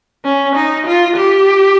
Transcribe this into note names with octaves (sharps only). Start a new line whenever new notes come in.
C#4
D#4
F4
G4